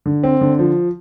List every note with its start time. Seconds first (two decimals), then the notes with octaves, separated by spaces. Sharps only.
0.06 D3
0.23 C4
0.41 D3
0.59 F3